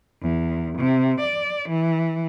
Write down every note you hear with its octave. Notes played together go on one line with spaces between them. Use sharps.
E2
C3
D5
E3